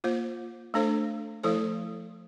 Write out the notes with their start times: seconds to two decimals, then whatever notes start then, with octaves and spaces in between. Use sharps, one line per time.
0.04 A#3 F4 C5
0.74 A3 D4 A4 C5
1.43 F3 A3 E4 A4 C5